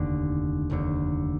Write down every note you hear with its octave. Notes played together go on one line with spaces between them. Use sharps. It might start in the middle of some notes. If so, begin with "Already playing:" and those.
Already playing: F1 D#2 D3
F1 D#2 D3